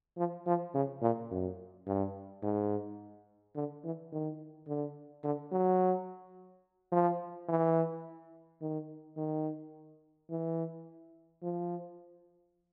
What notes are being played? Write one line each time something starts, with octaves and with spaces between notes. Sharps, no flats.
F3
F3
C#3
A#2
F#2
G2
G#2
D3
E3
D#3
D3
D3
F#3
F3
E3
D#3
D#3
E3
F3